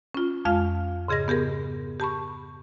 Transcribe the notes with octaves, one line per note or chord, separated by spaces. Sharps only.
C#4 F4
F2 G#3 F4 F5 F6
G#2 C#3 G#4 D#5 A#6
B3 G4 G#4 A#4
G4 A5 B5 C#6